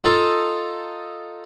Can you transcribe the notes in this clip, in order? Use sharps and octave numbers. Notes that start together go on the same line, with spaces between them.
D#4 F4 A4 D#5 A5 A#5